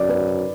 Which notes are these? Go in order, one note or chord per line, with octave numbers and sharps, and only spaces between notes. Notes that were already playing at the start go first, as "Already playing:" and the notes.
Already playing: F#2 D5
B4